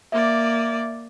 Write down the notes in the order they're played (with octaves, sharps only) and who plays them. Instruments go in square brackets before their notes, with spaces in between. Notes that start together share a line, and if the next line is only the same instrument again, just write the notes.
[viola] A#3 D5 [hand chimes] E5